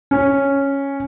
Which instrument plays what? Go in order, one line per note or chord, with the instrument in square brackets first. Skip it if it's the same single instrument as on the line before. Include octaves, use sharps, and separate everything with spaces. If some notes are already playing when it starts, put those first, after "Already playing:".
[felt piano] C#4